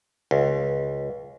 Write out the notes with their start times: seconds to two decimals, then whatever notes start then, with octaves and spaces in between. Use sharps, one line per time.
0.31 C#2